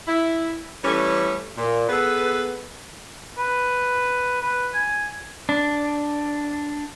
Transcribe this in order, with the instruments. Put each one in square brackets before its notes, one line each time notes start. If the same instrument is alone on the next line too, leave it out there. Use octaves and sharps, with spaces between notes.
[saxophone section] E4
E3 G3 A3 C#4
A#2
B3 G#4 A4 B4
[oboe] B4
B4
G#5
[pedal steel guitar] D4